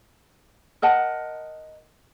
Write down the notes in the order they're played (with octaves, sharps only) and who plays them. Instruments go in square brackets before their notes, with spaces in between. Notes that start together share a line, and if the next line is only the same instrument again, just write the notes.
[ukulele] A#4 D#5 F#5 A5